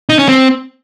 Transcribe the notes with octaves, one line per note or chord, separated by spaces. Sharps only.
D#4
C#4
C4